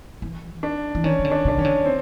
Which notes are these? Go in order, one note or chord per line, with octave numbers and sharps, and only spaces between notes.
E3
D4
E3
D#3 C#4
D#3
D3
D4
C#3
D4
D#3 C#4
D3
C4